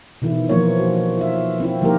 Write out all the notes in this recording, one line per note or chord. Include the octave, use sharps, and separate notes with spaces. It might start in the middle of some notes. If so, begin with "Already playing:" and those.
B2 D#3 E3 E4
E3 F3 A#3 F4 C#5
D#4 F#4
F4 E5
C4 E4 F4
D#3 F3 A#3 G4 A#4